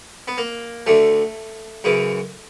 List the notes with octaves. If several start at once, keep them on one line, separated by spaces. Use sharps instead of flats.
B3
A#3
D2 D3 A3
F#2 C#3 E3